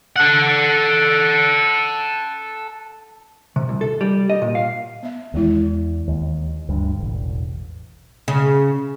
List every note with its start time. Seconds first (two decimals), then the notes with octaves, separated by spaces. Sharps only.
0.16 A4 F#5
3.56 C3
3.69 C2
3.81 A4
4.01 G3
4.30 D#5
4.42 A#2
4.55 F5
5.03 B3 E5
5.34 E2 D#3 G#3 E4
6.08 D#2
6.69 D2 G2
6.99 E1 A1
8.28 C#3